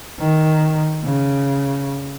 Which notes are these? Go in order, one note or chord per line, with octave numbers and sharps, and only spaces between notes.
D#3
C#3